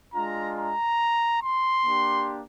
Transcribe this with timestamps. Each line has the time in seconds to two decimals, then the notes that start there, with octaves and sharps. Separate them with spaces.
0.14 G#3 D4 F4 A#5
0.56 A#5
1.42 C6
1.84 A#3 D4 G4